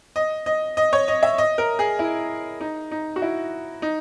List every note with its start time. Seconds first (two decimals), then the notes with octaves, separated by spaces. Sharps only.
0.16 D#5
0.46 D#5
0.77 D#5
0.93 C#5
1.08 D#5
1.23 E5
1.38 D#5
1.58 A#4
1.79 G#4
1.99 E4
2.60 D#4
2.91 D#4
3.16 F#4
3.22 E4
3.82 D#4